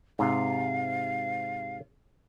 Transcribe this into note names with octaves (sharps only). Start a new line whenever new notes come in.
G#2 C3 F5